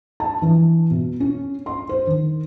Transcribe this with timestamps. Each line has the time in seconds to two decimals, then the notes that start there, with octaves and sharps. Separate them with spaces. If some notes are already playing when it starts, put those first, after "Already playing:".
0.20 A5
0.42 E3
0.90 B2
1.20 C#4
1.66 C6
1.89 C5
2.07 D#3